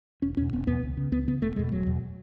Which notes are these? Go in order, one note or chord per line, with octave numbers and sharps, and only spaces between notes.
E1 C#4
E2 B2 C#4
E1 B3
E2 B2 B3
C#2
C#3
C#2 B3
C#3 B3
E1 A3
E2 B2 G#3
E1 F#3
E2 B2